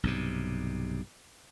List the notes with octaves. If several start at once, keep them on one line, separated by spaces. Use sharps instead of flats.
B1 G2 C3